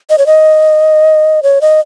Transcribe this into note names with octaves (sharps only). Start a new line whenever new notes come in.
D#5
C#5
D#5
C#5
D#5